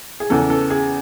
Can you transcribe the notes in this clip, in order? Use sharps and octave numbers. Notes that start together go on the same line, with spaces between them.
G#4
E2 C#3 E3 A4
A4
G#4